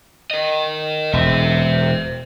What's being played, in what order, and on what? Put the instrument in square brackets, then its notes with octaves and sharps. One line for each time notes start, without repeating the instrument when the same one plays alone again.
[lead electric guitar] A#4 D#5
[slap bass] E1 [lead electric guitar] C5 E5